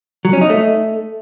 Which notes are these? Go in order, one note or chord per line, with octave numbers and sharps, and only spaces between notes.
F#3
C#4
D#4
A3